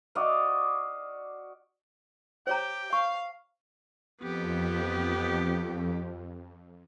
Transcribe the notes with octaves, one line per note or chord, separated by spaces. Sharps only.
F#4 D5 D#5 F5
G4 C5 C#5 G5 A#5
F5 C#6
F2 B3 G4